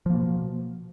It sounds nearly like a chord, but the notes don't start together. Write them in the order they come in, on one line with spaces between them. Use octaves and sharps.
F3 A#3 B2